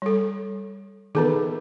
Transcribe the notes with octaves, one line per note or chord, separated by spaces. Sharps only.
G3 A4
D#3 E3 B3 G#4 A4 B4